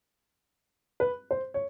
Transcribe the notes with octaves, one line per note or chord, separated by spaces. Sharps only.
B4
C5
C#5